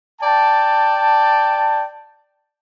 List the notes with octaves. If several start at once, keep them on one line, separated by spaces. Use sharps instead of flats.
D5 G5 A5